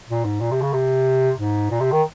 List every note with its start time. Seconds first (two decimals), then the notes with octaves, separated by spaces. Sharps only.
0.09 A#2
0.25 G#2
0.40 A#2
0.51 C3
0.62 C#3
0.73 C3
1.38 G#2
1.71 A#2
1.80 C3
1.92 D#3